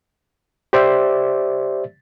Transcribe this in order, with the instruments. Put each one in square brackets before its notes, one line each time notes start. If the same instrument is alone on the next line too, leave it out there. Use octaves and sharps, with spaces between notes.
[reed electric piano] G4 C5 D5 E5